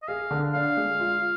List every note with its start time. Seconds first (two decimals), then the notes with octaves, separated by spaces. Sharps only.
0.02 D#5
0.08 G#4 F5
0.31 D3
0.54 D4 F5
0.77 G#3
1.00 F4